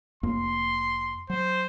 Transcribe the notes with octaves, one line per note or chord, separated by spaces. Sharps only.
F1 F2 A#3 C6
F#3 C5